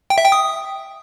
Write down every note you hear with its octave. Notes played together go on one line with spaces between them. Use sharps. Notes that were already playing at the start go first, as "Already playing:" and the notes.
G5
E5
G5
D#6